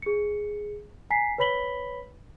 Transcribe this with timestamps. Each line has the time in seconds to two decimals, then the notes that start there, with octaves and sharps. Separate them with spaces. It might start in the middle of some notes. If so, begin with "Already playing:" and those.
0.02 G#4 C#7
1.10 G#5 A#5 B6 C7
1.38 B4 C#5 B5 B6 F#7 G7